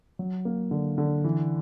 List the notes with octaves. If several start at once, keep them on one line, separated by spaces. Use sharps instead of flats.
F#3
A#3
D3
D3
E3